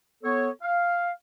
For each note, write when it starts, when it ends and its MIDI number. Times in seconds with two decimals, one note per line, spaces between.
0.23 0.50 59
0.23 0.50 69
0.23 0.50 73
0.62 1.11 77